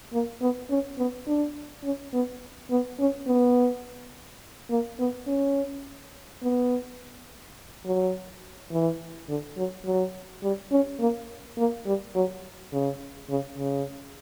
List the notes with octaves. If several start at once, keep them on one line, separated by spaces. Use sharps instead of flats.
A#3
B3
C#4
B3
D4
C#4
B3
B3
C#4
B3
A#3
B3
C#4
B3
F#3
E3
D3
F#3
F#3
G3
C#4
A#3
A#3
G3
F#3
C#3
C#3
C#3